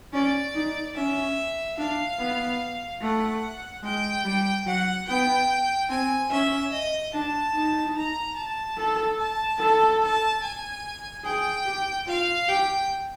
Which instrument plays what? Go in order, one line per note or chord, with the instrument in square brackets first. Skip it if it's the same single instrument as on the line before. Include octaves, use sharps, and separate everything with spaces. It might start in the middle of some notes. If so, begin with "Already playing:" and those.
[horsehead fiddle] C#4 [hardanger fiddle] D5
[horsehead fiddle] D#4
[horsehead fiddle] C#4 [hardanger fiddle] E5
[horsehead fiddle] D4 [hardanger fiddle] F5
[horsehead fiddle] B3
[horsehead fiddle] A3 [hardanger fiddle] F#5
[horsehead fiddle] G#3 [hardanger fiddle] G5
[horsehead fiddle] G3
[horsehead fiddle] F#3 [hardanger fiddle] F#5
[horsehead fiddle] B3 [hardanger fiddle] G5
[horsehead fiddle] C4 [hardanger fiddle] G#5
[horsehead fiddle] C#4 [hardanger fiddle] E5
[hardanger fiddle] D#5
[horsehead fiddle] D4 [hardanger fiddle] A5
[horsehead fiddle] D#4
[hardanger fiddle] A#5
A5
[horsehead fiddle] A4
[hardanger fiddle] A5
[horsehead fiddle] A4
[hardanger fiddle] A5
G#5
[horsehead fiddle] G#4 [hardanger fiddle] G5
[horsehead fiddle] G4
[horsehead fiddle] F4 [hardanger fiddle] F5
[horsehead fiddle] G4 [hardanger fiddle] G5